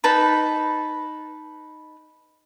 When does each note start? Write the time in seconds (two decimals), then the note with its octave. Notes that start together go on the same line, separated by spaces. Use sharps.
0.04 D#4 B4 A5 B5